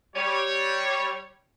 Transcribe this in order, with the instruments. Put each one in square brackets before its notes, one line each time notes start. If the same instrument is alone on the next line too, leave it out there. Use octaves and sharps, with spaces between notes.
[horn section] G3 C#5